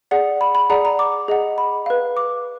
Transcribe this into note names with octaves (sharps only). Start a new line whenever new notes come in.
G#4 D5 F#5
B5
B5
G#4 D5 F#5 A#5
A#5
D6
G#4 D#5 F#5
B5
B4 F5
D6